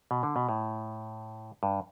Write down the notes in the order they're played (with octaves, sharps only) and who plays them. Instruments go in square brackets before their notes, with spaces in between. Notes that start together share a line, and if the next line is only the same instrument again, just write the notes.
[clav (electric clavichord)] B2
D3
B2
A2
G2